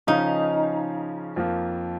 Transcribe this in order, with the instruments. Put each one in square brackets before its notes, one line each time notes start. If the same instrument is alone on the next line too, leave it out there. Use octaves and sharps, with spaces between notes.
[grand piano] C#3 F3 C#4 G#4 F5 [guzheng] D#4
[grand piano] F2 F3 A#3 F4